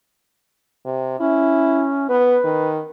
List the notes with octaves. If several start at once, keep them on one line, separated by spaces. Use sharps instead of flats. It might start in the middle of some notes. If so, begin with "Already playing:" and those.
C3
C#4 E4
B3 B4
D#3